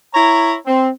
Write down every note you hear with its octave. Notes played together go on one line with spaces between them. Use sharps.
E4 C#5 A#5
C4